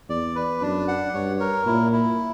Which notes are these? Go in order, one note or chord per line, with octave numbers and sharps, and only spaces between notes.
E2 D5
B4
F#2 D4
F#5
G2 C#5
A#4
A#2 E4
E4